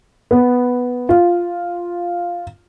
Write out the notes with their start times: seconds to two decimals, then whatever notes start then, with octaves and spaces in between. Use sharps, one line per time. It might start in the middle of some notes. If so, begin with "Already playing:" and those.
0.31 B3
1.09 F4